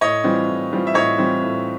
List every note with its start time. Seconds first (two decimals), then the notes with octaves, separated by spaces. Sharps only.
0.01 A2 C#5 D#5
0.24 E3 G3 C4 F4
0.48 A2
0.72 E3 G3 C4 F4
0.87 E5
0.94 A2 C#5 D#5
1.18 E3 G3 C4 F4
1.42 A2